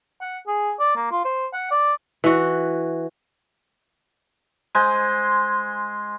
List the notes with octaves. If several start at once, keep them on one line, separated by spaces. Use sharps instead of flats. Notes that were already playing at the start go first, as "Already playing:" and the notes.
F#5
G#4
D5
A#3
F4
C5
F#5
D5
E3 F#4
G#3 C5 G#5